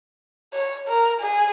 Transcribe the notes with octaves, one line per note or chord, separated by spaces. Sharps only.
C#5
A#4
G#4